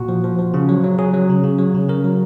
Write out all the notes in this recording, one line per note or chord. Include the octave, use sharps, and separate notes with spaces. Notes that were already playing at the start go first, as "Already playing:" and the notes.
Already playing: A#2 F#4
F3
F3
F3
C#3
F#3
F#3
F#3 G#4
F#3
C#3
C#3
F#3
C#3
C#3 A#4
F#3